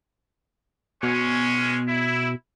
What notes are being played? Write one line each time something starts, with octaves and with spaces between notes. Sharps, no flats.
B2 G#3 C#4
E4